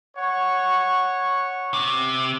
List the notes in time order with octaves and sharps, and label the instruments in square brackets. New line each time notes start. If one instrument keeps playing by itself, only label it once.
[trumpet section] C#5 F#5 C#6
[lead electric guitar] C3